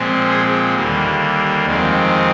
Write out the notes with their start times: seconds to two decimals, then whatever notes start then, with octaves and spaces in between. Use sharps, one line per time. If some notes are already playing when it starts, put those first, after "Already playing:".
Already playing: A#2 F3 G#3 C4
0.29 G#4 C5
0.75 D#2 D3 G3 A#3
1.66 F2 D#3 G#3 C4